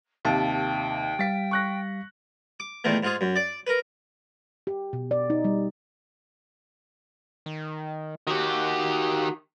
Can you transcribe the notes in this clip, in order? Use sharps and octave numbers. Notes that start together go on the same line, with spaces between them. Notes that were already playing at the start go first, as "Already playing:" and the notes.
D#2 C3 F5 G5 A5
G3 F5 A6 B6
C#6 F#6 A#6
D6
E2 A#2 D#3 A3
G#2 F4 G#4
F#2
D5
A#4 B4
G4
B2
D5
D#4
G3
D#3
D#3 F#4 G4